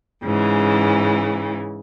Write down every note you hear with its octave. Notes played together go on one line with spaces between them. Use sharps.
G#2 C#3 E3